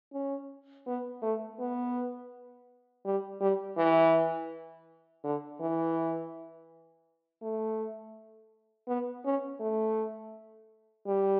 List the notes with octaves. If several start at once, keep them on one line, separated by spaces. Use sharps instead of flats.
C#4
B3
A3
B3
G3
G3
E3
D3
E3
A3
B3
C#4
A3
G3